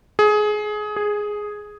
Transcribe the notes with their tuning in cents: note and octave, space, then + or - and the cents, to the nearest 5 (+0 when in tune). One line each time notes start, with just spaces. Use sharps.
G#4 +20
G#4 +0